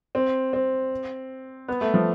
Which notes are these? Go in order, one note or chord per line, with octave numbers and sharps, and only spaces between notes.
C4
C4
B3
A3
F3